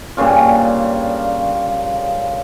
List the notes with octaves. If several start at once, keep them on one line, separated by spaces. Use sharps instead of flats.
G2 A#2 C#3 F4